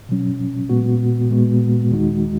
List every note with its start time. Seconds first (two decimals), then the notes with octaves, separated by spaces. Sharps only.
0.09 B2 F#3 C#4
0.69 A#2 G#3 B3 F#4
1.30 A#2 G#3 B3 F#4
1.91 D#2 D#3 G#3 D#4 F#4